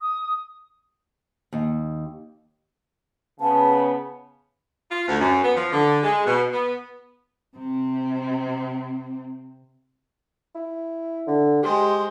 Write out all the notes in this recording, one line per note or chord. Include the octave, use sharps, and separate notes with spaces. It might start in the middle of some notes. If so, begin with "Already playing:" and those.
D#6
D#2
C#3 B3 A5
F4
D2
F#2
B3
F3
D3
G#3
B2
B3
C3 C4
E4
D3
G#3 G4 C5